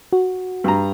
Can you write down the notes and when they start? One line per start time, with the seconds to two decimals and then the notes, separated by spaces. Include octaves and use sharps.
0.13 F#4
0.64 G2 A#5